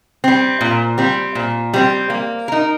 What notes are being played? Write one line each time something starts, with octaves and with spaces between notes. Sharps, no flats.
G3 C4
A#2
G3 C4
A#2
G3 C4
A#3
D#4 A#4